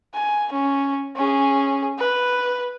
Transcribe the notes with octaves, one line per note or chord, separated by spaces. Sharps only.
G#5
C#4
C#4 G#4
B4